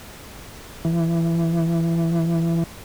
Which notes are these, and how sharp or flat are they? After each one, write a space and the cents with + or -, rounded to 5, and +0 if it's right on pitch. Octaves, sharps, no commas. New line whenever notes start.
E3 +20